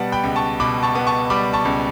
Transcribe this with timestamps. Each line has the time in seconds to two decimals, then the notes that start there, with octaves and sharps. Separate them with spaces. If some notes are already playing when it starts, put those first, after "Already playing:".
Already playing: B2 G3 B3 D5 F#5 A5
0.12 G5 B5
0.24 C#2
0.36 A5 C#6
0.60 B2 B5 D6
0.83 A5 C#6
0.95 B3
1.07 A5 C#6
1.30 G3 B5 D6
1.54 A5 C#6
1.65 C#2